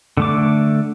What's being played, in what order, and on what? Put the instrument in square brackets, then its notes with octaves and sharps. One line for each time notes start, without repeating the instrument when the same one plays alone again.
[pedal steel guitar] D3 A3 D6